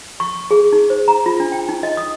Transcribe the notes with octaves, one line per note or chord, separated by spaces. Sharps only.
C#6
G#4
D#4
C5
A#5
F4
D4
G5
D#4
D#5
D#6